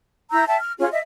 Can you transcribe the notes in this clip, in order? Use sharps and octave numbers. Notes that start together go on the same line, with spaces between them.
E4 A#5 E6 G6
E5 G5 A5
F6
C#4 F4 G#4 C#5
D#5 E5